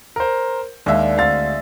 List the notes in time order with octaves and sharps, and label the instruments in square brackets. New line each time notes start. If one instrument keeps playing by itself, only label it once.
[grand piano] A#4 C5
[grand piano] D#2 [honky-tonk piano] G#3 E5 [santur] D4
[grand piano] D2 F5 A6 [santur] C4